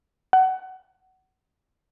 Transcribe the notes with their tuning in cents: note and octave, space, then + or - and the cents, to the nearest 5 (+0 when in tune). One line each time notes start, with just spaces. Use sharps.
F#5 +25